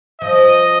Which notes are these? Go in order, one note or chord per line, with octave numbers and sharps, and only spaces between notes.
F3 D#5